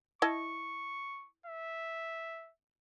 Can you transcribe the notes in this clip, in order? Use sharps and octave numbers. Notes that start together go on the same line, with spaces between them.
E4 D#5 A5 C#6
E5